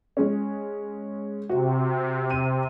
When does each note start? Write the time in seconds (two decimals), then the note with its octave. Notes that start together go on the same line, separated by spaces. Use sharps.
0.17 G#3 C#4
1.49 C3 F#4
2.30 D#7